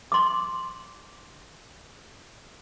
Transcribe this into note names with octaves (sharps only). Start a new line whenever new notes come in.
C6 D6